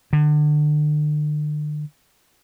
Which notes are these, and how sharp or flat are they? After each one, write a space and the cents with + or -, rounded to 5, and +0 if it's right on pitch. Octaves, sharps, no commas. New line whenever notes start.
D3 +35